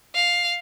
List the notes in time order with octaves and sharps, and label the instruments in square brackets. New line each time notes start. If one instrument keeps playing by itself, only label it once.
[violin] F5